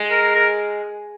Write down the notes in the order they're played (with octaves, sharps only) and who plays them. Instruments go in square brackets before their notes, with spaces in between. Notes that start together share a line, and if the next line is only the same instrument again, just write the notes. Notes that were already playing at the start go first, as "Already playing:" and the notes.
Already playing: [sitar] G#3
[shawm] A#4
A#4